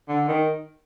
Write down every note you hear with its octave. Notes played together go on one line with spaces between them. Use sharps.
D3
D#3